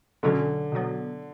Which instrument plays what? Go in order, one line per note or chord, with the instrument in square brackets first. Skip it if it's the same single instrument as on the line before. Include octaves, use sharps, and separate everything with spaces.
[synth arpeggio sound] B1 B2 F#3 C#4 [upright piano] D3
[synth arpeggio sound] B2 F#3 B3